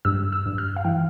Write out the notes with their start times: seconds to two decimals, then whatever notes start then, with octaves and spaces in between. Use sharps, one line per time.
0.05 G2 E6
0.32 E6
0.46 G2
0.58 F6
0.76 F5
0.84 E3 G5